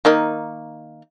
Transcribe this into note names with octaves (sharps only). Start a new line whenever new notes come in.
D#3 A#3 D#4